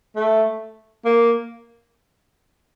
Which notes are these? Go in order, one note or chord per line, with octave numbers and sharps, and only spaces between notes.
A3
A#3